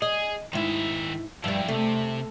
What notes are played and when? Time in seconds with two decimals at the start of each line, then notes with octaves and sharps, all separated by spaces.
0.02 G#4 D#5
0.53 G#2 D#3 E4 E5
1.44 G2 F3 G3 E4
1.68 C3 A3